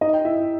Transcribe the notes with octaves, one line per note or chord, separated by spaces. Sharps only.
D#4 D#5
G5
E4 E5